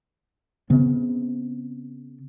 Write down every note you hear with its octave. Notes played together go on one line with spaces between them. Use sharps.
C#3 B3 C4